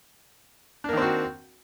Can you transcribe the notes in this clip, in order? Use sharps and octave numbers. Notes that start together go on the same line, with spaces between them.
D#3 A#3 C4 D4 F#4